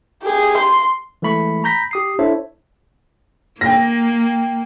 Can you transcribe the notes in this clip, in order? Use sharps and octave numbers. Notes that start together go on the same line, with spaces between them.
G4 G#4
C6
E3 G#3 A3 B5 C#6
A#5 B5 G6 A#6 B6
G4 D#6 C7
D4 E4 A4 C5 C#5 E5
A#3 G5 A#6